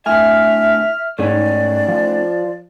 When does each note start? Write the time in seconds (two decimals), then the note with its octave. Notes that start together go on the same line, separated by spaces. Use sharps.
0.06 D2 A2 E5 G#5 F6
1.19 G#2 A3 C#4 D#4 D5
1.88 F3